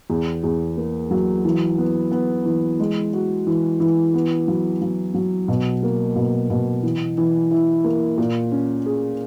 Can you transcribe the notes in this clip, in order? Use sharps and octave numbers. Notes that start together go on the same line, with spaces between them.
E2
E2
A#3
F#3
E3
B3
B3
E3
G#3
F#4
E3
E3
B3
F#3
F#3
F#3
B2
A#3
B2
B2
E3
E3
E4
A#3
A#2
C#4
G#4